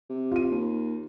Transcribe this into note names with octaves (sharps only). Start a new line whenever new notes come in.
C3
F4 D#7
D#2